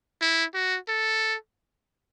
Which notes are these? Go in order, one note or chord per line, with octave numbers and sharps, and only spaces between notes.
E4
F#4
A4